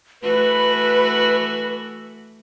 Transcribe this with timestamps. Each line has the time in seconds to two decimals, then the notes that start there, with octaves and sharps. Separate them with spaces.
0.23 E3 A3 F#4 B4